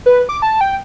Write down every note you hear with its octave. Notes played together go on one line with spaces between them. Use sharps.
B4
D6
A5
G5